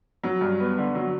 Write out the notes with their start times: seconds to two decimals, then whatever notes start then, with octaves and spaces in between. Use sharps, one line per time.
0.23 F#3
0.41 G2
0.60 B3
0.78 D3
0.95 F#3